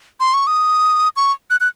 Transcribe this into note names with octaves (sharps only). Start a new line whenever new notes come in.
C6
C#6
D#6
C#6
F#6
F#6